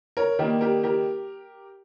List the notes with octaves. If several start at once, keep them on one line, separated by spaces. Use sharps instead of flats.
A#4 C#5
D#3 G3 A#3 G4 A#4
G4 A#4
G4 A#4